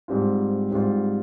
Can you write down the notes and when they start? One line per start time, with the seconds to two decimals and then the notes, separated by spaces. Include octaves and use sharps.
0.08 G#2 G3 C4 F4
0.71 G#2 G3 C4 F4